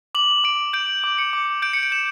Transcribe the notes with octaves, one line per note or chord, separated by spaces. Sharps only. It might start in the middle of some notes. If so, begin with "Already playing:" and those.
D6 F#7
D6 D7
G6 D7
D6
C#7
D6
G6 D7
C#7
D7
G6 E7